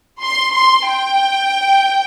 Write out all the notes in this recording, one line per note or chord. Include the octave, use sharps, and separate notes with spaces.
C6
C6
G5